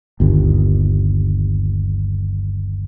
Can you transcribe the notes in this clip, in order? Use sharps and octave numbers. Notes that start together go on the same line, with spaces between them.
G1 D#2